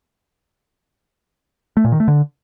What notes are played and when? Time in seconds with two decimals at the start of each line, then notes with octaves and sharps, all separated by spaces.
1.77 A3
1.84 A#2
1.92 D#3
2.00 A3
2.08 D3